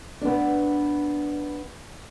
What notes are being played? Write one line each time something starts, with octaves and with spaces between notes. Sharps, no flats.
B3 D4